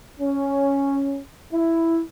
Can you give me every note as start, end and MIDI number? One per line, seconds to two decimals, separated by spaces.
0.20 1.19 61
1.53 2.00 64